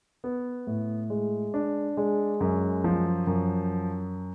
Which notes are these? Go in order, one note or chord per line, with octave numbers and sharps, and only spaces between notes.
B3
A2
G#3
D4
G#3
F#2
F3
F#2